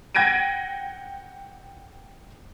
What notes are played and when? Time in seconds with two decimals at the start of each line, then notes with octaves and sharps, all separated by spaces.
0.15 F#5 G5 G#6 A#6 D7 D#7